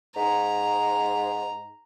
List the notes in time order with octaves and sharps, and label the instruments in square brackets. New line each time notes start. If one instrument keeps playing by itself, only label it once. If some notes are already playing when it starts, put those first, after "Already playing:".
[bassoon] G#2 [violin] A#5